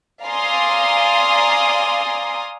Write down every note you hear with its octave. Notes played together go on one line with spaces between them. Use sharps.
D5 F5 G#5 A#5 C6 D#6